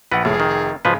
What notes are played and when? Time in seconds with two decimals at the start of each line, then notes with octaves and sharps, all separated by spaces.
0.12 A#1 B4 F#5
0.25 F1 A2 G#4
0.40 D#3
0.85 G#2 C#3 F3 G#3 B4